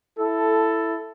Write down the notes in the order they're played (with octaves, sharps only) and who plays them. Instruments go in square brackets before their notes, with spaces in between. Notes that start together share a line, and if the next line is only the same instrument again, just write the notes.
[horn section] E4 A4